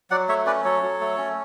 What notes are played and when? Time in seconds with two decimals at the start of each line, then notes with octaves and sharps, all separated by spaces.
0.10 F#3 D5 F#5
0.29 A3 C#5 E5
0.46 C#4 B4 D5
0.64 F#3 A4 C#5
0.82 F#3
1.00 A3
1.18 C#4